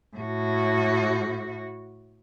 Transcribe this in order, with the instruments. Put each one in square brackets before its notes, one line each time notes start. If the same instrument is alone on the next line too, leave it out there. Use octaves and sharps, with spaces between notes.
[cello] A2 F#4